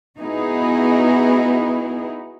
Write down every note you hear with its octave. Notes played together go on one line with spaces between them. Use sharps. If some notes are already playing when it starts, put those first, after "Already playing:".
B3 D#4 E4 F#4 G#4